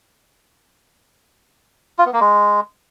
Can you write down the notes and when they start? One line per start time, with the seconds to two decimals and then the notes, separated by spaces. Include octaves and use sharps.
1.99 F4
2.06 B3
2.13 A#3
2.21 G#3